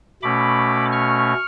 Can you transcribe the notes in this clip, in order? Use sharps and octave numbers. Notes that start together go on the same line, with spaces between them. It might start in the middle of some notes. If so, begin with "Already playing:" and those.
B2 A3 C#4 B5 D6
C#6 F6